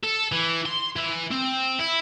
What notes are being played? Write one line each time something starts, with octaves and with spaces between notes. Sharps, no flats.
A4
E3
C6
E3
C4
E4